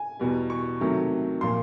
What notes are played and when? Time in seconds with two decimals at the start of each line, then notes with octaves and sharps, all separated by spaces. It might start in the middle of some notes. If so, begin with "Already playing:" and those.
Already playing: G#5
0.19 E2 B2 G3
0.50 C#6
0.81 C3 D#3 F#3 A3
1.41 A#2 F3 A#3 C6